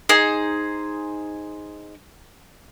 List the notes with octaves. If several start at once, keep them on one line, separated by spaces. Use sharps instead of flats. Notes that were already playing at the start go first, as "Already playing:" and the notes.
D#4 G#4 C5